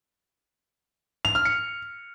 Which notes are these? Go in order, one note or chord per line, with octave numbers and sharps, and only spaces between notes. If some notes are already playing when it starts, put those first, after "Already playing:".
F7
F6
C#7